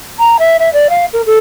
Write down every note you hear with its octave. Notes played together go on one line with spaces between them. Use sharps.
A#5
E5
E5
D5
F5
A#4
A4